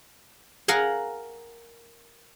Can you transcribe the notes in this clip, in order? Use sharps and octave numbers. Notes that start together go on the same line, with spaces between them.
A#4 F5 F#5 G#5